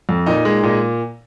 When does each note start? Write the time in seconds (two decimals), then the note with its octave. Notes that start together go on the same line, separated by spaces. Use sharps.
0.09 F2
0.26 A#2 D#4
0.45 G#3
0.63 A#2